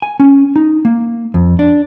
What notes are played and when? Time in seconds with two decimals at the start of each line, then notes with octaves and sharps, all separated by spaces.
0.02 G#5
0.20 C#4
0.56 D#4
0.85 A#3
1.34 F2
1.59 D4